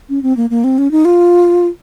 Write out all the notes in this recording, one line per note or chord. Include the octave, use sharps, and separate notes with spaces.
C#4
C4
A#3
A#3
C4
C#4
D#4
F4